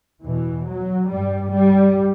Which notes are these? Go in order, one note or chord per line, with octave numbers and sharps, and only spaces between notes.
E2 B2 E3
F#3
G2 G3
G3